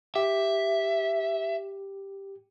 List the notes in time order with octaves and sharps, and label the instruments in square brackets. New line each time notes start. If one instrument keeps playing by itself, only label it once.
[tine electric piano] G4 [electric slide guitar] E5